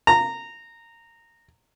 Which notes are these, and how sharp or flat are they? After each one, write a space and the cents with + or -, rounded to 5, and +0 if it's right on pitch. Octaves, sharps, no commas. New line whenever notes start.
A#5 -15